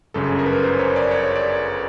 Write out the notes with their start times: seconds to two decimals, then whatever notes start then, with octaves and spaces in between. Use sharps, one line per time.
0.14 G1 F#2 C#3 A4
0.39 A#4
0.46 B4
0.53 A#4
0.63 C5
0.79 C#5
0.96 D5
1.11 C#5
1.36 D5